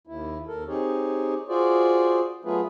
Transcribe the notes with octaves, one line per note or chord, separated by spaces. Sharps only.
D#2 E4
D#2 A4 A#4
C4 D#4 G4 G#4 C#5
F4 F#4 G#4 C5 D5
F#3 A3 B3 F4 G#4 B4